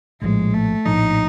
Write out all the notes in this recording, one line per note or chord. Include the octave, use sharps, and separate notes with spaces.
A#1 A2 F3 G#3
A3
A#1 A2 F3 D#4